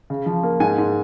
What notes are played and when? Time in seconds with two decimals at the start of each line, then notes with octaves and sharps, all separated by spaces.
0.10 C#3
0.26 F3
0.43 A#3
0.60 G#2 G#5
0.78 G#2